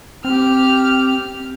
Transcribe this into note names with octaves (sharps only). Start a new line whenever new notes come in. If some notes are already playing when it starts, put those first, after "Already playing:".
C4 G4 F6